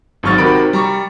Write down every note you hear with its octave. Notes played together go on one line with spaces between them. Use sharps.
G#1 G#2 F#3 C#6 F6 A6
C3 D#3 F#4 A#4 B5 D7
G3 A#5 C#6